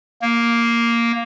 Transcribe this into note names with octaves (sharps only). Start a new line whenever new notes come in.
A#3